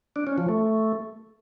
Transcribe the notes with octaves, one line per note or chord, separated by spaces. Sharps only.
D4
C#4
F3
A3